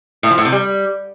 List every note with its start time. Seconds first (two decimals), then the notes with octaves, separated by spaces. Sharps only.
0.23 A2
0.31 F3
0.38 A2
0.45 C3
0.52 G3